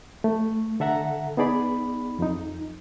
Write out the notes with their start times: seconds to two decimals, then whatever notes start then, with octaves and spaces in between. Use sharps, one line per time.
0.24 A3
0.80 D3 A4 E5 F#5 A#5
1.37 B3 D#4 G#4 D5 B5
2.19 F2 D#4